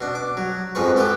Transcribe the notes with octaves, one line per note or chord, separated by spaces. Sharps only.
B2 D4
D6
F#3
F2 G#2 F3 B4 C#6
B3 G4 A4 B4